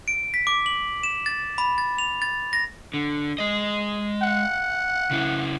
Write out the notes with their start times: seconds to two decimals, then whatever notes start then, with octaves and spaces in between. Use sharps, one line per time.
0.08 D7
0.34 B6
0.47 D6
0.66 F#7
1.03 E7
1.26 A6
1.58 B5
1.78 A6
1.98 F7
2.22 A6
2.53 A#6
2.94 D3
3.38 G#3 D#5
4.23 F#5
5.11 C#3 E4